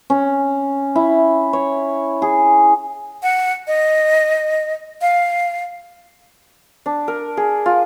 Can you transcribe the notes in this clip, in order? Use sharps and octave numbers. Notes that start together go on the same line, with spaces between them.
C#4
E4
C#5
G#4
F#5
D#5
F5
D4
A#4
G#4
F4